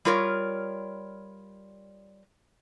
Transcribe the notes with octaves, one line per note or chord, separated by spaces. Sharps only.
G3 F4 A#4 C#5